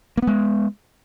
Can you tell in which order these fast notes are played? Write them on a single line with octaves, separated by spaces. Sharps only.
A#3 B3 G#3